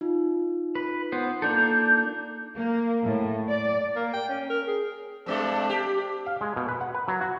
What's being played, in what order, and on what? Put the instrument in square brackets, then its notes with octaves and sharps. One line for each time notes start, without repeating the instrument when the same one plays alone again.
[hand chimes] D#4 F4
[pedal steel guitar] B4
B3 C5
[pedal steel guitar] A#3 D4 A4 [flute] G6
[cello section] A#3
A2
D5
[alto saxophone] A#3
G5
C#4
A#4
G#4
[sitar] G2 G#3 A4 [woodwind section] C4 D4
[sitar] G4
[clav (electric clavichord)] F5
G#3
B2
B4
F#5
B4
F#3
F#4